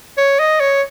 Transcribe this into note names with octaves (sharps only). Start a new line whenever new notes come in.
C#5
D#5
C#5